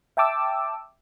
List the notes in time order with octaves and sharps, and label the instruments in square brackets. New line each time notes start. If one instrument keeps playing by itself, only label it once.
[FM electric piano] E5 G5 A5 D6 E6